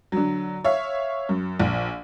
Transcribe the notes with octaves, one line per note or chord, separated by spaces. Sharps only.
D3 F#3
C#5 E5 F5
F#2
A#1